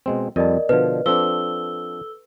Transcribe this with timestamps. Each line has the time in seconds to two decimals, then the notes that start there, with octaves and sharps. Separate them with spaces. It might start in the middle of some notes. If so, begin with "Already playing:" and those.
0.06 B2 G#3 C4
0.36 F2 G3 A#4 D5 D#5 A5
0.69 B2 D3 F3 B4
1.06 F3 C4 D4 A4 E6 G7